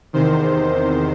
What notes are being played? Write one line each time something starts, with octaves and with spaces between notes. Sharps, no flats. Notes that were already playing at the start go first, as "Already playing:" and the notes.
E2 C3 D#3 C5